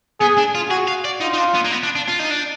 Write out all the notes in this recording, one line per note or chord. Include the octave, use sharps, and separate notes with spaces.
B3 G#4
D4
F4
F#4 G#4
F5
D5
D#4 F4
D#4
D4
B3
A#3
B3
D4
D4
F4
D#4
D4